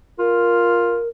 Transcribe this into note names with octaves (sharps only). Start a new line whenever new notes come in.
F4 A#4